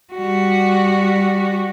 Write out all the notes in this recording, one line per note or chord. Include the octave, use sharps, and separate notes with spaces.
G3 F#4